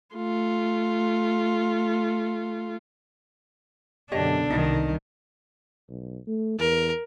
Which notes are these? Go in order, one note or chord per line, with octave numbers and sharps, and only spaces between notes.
A3 F4
F#2 B2 D3 D4 G4 C#5 D#5
C2 D#3 D#4
B1
A3
E2 A#4